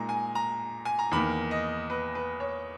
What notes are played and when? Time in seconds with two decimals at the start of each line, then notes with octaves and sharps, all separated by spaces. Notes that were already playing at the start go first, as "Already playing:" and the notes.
Already playing: A#2 G#3 D#4 A#5
0.09 G#5
0.35 A#5
0.85 G#5
0.99 A#5
1.11 E2 D#3 A#3 B5
1.51 D#5
1.90 B4
2.15 B4
2.40 C#5